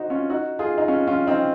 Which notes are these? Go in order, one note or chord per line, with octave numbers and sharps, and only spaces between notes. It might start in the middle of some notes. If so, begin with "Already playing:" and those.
Already playing: D#4 F#4 C5 D#5
C#4 F4
D#4 F#4
F4 G#4
D#4
C#4 F4
C#4 F4
C4 D#4